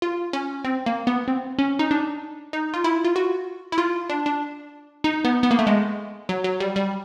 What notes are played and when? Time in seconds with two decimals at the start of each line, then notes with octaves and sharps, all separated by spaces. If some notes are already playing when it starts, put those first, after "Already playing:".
0.02 F4
0.33 C#4
0.64 C4
0.86 A#3
1.07 B3
1.28 C4
1.59 C#4
1.79 D#4
1.91 D4
2.53 D#4
2.74 F4
2.84 E4
3.04 F4
3.16 F#4
3.72 E4
3.78 F4
4.10 D4
4.26 D4
5.04 D#4
5.25 B3
5.43 B3
5.51 A#3
5.59 A3
5.67 G#3
6.29 F#3
6.44 F#3
6.60 G3
6.76 G3